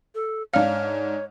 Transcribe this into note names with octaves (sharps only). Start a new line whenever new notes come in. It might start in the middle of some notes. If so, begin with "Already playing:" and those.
A4
G#2 D4 C#5 F5 F6